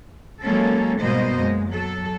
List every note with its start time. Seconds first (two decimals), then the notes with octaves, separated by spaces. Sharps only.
0.42 F#3 G#3 A#3 C#4 A4
1.00 G#2 B2 G3 A#3 C5 D#5
1.37 F#2 G#3
1.70 F#3 A4